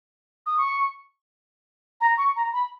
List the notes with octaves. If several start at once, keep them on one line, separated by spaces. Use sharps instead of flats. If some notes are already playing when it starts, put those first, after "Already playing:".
D#6
C#6
A#5
C#6
A#5
B5